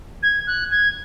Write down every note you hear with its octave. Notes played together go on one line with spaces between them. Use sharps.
G#6
F#6
G#6